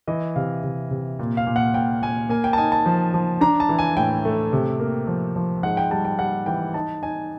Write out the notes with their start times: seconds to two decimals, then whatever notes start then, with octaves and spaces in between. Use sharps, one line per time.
0.07 E3 D#5
0.36 C3 F5
0.63 C3
0.91 C3
1.19 A#2
1.37 F5
1.47 A#2
1.56 F#5
1.74 A#2 G5
2.02 A#2 G#5
2.29 A#3 G#5
2.44 G5
2.53 A5
2.58 D#4 G#5
2.72 A5
2.86 F3
3.14 F3
3.41 D4 A#5
3.60 A5
3.69 E3
3.79 G#5
3.97 A2 G5
4.25 A3
4.53 C3
4.80 A#3
5.07 F3
5.36 F3
5.63 G#2 F#5
5.77 G5
5.91 G3 A5
6.05 G5
6.19 G3 F#5
6.46 E3 G5
6.74 D#4 A5
7.02 D#4 G#5